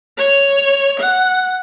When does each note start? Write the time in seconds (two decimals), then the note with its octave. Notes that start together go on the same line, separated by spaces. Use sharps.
0.17 C#5
1.00 F#5